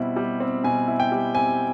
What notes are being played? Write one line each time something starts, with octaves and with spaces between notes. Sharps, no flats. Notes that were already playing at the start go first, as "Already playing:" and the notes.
Already playing: B2 G3 C4 E4
G3
C4
B2 G#5
E4
G5
G3
C4 G#5